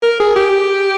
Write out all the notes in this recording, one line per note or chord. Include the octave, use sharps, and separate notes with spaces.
A#4
G#4
G4